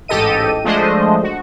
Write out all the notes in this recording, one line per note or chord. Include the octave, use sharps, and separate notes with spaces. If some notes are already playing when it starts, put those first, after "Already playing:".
A1 G#2 G4 A4 D#5 D#7
F3 G#3 A3 D4 C5 D#5
F#4